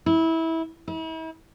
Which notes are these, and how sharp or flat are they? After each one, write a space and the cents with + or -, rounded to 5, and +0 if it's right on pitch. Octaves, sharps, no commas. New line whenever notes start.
E4 -20
E4 -40